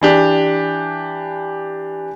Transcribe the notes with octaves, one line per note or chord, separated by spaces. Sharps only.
E3 D4 G4